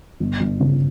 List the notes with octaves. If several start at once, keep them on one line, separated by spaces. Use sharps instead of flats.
G1
G1
C#3